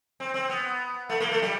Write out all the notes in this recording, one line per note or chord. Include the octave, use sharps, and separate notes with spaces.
C4
C4
B3
A3
A#3
A3
G3